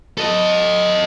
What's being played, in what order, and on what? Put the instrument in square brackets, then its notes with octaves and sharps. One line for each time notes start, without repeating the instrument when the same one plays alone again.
[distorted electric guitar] A4 D#5